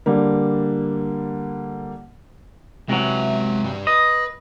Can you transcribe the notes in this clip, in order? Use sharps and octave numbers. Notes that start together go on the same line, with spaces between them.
D3 G3 A#3
C3 E3 F#3 G#3 E5
G2 G3
B4 D#5